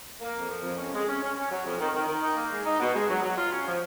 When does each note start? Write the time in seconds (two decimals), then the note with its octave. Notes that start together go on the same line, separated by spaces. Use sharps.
0.20 A#3
0.35 F2
0.49 F3
0.63 F2
0.78 C#4
0.93 G#3
1.07 C#4
1.22 C#4
1.35 C#4
1.51 F#3
1.64 F2
1.79 D#3
1.94 D#3
2.08 D#3
2.22 D#4
2.36 A#3
2.51 G#3
2.65 D#4
2.79 B2
2.93 G#3
3.08 F#3
3.22 F#3
3.37 F4
3.51 C#4
3.66 F3